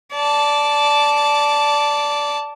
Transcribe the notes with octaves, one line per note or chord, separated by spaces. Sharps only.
D5 A5